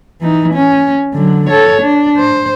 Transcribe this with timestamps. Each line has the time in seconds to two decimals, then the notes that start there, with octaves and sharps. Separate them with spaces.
0.21 E3 D#4
0.54 C#4
1.13 D3 F#3
1.49 A4 C#5
1.81 D4
2.18 C5